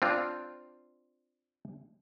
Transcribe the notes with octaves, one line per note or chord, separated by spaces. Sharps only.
C4 D4 F4